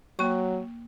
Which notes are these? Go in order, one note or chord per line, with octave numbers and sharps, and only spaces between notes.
F#3 A#3 C#6